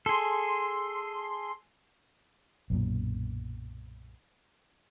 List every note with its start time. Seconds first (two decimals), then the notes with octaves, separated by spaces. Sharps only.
0.06 G#4 A4 C6
2.70 B1 F#2 A#2